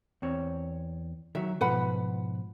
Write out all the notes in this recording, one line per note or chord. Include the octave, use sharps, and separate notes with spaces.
E2 C4 C#5
D#3 F#3 E5
G#2 B2 F3 B4 F#5 B5